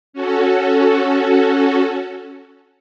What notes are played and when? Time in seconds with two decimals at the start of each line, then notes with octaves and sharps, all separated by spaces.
0.13 C#4 F#4 A4